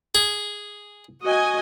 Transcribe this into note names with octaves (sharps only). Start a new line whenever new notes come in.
G#4
F#4 D#5 G#5